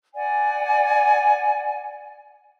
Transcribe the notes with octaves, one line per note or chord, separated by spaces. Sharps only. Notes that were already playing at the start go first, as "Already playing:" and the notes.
D5 F#5 G#5